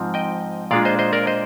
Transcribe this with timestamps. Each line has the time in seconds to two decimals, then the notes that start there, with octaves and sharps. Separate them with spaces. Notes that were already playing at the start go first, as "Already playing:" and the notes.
Already playing: G#2 F3 C4
0.14 D#5 G5
0.71 A#2 G#3 D4 F4 D5 F5
0.85 C5 D#5
0.99 C5 D#5
1.13 A#4 D5
1.27 C5 D#5